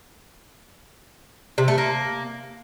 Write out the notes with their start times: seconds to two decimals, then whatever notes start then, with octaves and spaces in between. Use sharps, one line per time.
1.58 C3
1.68 A3
1.78 A#3